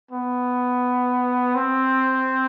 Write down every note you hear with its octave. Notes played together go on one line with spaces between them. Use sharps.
B3
C4